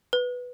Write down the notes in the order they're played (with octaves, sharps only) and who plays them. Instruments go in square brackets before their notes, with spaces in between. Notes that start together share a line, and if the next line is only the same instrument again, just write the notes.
[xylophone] B4